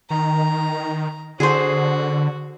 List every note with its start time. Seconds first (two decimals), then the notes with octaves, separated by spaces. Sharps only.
0.10 D#3 A#5
1.40 D3 F#4 G#4 C5